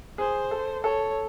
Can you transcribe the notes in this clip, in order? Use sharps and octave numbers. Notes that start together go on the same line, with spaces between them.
G#4 C5
A4
A4 C#5